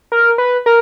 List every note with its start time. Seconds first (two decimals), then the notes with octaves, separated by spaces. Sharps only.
0.12 A#4
0.38 B4
0.66 A#4